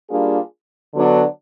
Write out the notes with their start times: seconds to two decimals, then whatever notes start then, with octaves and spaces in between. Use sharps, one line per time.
0.09 G3 A#3 D4 F4 G#4
0.94 D3 F#3 B3 D4